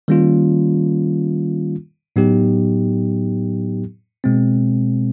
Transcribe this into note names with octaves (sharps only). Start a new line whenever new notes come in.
D#3 G3 A#3 C#4 F4
A2 F#3 B3 D#4 G4
B2 G#3 C4